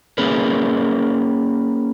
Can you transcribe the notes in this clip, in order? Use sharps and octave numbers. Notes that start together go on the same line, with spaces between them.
A#3 C#4 G#4 A#4 B4